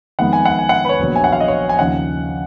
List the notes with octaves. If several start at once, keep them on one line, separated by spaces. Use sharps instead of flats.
F2 D#3 G#3 B3 F#5
G#5
F#5
G#5
F#5
B4
C#5
A#1 A#2 F#3 B3
G#5
F#5
F5
D#5
C#5
G#5
D#2 C#3 F3 F#5